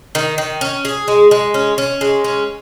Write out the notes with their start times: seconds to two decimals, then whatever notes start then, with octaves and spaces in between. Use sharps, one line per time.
0.15 D#3
0.38 D#3
0.61 C#4
0.85 G#4
1.08 G#3
1.31 G#3
1.54 C#4
1.78 C#4
2.01 G#3
2.24 C#4